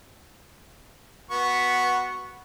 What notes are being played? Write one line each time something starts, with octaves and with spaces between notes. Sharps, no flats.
B3 F#4 C#6